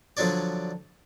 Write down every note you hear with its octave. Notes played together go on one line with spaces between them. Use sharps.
D3 F3 F#3 D4 C#5 D5